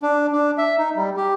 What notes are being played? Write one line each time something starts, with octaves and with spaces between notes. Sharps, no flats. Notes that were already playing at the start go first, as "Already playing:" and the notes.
D4
D4
E5
D#4
G3
G4